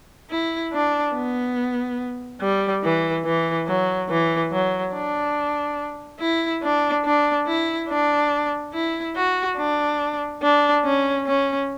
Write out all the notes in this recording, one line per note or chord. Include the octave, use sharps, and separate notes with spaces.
E4
D4
B3
G3
E3
E3
F#3
E3
F#3
D4
E4
D4
D4
E4
D4
E4
F#4
D4
D4
C#4
C#4